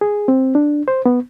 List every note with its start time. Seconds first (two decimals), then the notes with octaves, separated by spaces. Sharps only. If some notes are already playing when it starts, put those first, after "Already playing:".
0.01 G#4
0.28 C4
0.55 D4
0.88 C5
1.06 B3